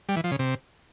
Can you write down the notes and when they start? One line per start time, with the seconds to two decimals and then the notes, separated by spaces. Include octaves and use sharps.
0.09 G3
0.16 E3
0.24 F3
0.32 C#3
0.39 C3